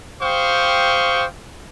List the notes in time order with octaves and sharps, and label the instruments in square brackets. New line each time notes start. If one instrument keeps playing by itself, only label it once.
[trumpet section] G4 C5 F5 G5 C#6 D#6